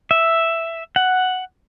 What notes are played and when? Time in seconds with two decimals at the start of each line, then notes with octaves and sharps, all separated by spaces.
0.11 E5
0.96 F#5